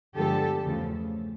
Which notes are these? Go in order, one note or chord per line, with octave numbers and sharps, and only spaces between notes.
G2 D3 F3 G#3 B3 G4 A4
E2 C#3 F3 A3